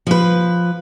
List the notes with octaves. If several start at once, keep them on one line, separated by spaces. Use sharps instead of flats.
F3 B4